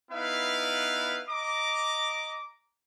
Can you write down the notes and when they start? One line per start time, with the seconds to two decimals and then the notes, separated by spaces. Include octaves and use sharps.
0.11 B3 D#4 E4 B4 F5
1.29 D#5 A#5 D6